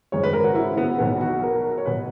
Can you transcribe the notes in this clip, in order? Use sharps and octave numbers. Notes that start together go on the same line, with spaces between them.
G#1 F#2 C#3 G#3 C#5
B4
A#4
F#4
E4
B3
B1 B2 F#3 B3
F#4
A#4
C#5
B2 F#3 B4